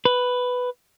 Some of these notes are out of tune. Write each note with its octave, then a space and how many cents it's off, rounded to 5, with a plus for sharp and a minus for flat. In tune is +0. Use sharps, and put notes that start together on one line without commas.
B4 +5